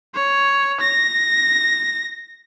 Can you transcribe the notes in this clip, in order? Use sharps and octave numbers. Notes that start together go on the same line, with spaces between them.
C#5
A#6